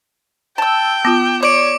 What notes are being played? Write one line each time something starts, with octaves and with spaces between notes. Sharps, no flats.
G5 A5 E6
B3 F4 D6
C#5 D5 D6 D7